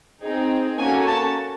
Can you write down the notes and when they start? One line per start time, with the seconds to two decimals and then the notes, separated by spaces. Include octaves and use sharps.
0.21 C4 D#4 G#4
0.78 A#3 C#4 F#4 A4 G#5
1.06 A5